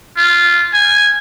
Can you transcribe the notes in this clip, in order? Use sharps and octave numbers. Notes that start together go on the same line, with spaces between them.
F4
G#5